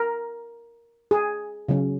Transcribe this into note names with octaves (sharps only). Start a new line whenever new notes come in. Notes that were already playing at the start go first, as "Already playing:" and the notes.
Already playing: A#4
G#4
C#3 F#3 C#4